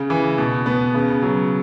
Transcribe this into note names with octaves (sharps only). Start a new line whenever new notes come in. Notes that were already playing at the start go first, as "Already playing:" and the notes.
Already playing: C#3
E3
B2
B3
C#3
F#3